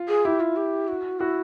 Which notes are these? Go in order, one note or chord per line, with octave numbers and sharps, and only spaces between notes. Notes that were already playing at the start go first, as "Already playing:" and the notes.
Already playing: F4
G#4
E4 G4
F4
G4
F#4
E4 F#4